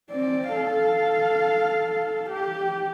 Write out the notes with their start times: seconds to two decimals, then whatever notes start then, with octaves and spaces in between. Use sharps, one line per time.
0.11 C4 D5
0.51 A4 F5
2.30 G4